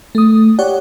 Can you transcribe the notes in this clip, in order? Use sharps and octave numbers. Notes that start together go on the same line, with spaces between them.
A3 D#6
G4 C#5 D5 F#5